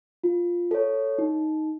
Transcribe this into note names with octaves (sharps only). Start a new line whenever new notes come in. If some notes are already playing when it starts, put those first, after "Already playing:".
F4
A4 C#5
D#4